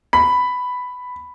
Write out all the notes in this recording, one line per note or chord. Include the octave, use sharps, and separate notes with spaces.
B5